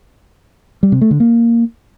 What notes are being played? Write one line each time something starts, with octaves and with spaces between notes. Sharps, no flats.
G3
C3
A3
D3
A#3